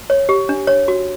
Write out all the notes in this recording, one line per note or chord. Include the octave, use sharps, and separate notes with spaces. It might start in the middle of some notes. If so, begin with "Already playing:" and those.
C#5
G4
D4
C#5
F#4